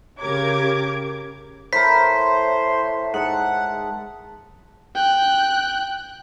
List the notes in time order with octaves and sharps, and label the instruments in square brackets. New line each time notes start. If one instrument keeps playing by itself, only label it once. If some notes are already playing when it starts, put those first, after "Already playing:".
[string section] C#3 G4 A#4 C#5 D6 G#6
[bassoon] A2 [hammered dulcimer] A#4 B5 [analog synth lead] C5 [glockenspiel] B6
[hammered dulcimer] G#2 E5 A5 [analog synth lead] F#5
[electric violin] G5 F#6